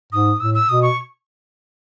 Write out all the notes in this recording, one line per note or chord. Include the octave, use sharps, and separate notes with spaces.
G#2 D#6
A2 E6
E6
B2 D#6
C#6